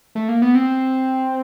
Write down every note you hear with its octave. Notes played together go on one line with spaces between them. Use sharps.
A3
A#3
B3
C4